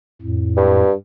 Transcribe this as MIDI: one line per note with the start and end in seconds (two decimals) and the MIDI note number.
0.21 0.82 41
0.21 0.82 45
0.56 0.93 43